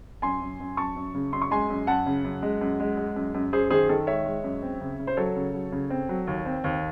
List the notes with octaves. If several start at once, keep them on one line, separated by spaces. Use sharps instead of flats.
F#2 G#5 C6
F#2
F#2
F#2 A5 C#6
F#2
C#3
F#2 C6
C#6
G#3 G#5 C6
F#2
F#2 F#5 A5
C#3
F#2
G#3
F#2
G#3
G#3
F#2
F#2
F#2 G#4 C5
D#3 G#4 C5
D#3 A4
G#3 C#5 E5
G#3
F#2
C4
C#3
C#3
C5
F#3 A4 C#5
C#3
F#3
C#3
C4
F#3
D#2
C4
D#2